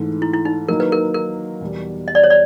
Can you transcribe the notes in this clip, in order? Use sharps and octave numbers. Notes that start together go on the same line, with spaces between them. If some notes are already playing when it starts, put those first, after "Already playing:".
Already playing: G#2 E3 A3
E4
E4
D#4
D#3 F#3 A#3 D#4 A#4
B4
A#4
A#4
E2 B2 G3
D#5
D5
C#5
D5